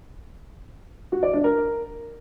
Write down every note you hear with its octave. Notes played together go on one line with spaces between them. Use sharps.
F#4
D5
D4
A#4